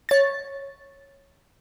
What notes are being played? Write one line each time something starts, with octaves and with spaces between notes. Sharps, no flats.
C#5 A6